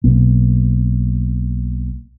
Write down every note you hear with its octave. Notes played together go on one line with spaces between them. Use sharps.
B1 A#3